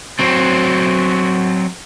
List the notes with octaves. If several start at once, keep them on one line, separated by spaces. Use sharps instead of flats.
F#3 C4